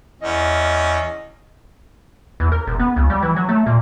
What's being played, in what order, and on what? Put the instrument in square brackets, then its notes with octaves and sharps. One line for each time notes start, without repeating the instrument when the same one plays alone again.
[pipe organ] E2 [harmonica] C#4 [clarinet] D#5
[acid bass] E2
A#4
E1
B3
C#2
G3
E3
F#3
A3
A#2